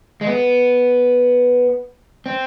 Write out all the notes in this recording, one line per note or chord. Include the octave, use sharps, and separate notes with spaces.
G#3
B3
C4